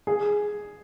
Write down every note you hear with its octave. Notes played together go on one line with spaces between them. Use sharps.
G#4